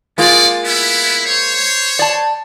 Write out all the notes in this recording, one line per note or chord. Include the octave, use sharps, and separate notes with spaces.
G#3 A#3 C#4 F4 D5
B3 E4
C5 C#5
D5 A5